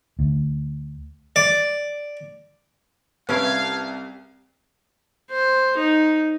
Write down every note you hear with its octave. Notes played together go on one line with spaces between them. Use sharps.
D2
D5
C2 C#4 E4 A#4 B4 F5 A5 G#6
C5
D#4